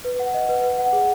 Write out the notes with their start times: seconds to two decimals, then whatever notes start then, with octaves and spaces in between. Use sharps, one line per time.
0.05 B4
0.19 F#5
0.34 D#5
0.49 B4
0.64 B4
0.78 F#5
0.93 G#4